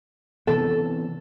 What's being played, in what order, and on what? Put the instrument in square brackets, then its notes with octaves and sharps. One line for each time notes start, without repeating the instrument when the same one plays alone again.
[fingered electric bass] C3 E3 B3 [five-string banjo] A4